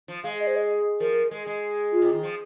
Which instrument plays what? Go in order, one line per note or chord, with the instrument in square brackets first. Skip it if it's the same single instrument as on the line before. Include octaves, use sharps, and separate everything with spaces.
[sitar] F3
[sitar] G#3 [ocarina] F5
[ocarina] D#5
C5
D#5
[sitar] F3 [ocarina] A#4
[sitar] G#3
G#3
[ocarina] F4
[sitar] C3
D#3
F3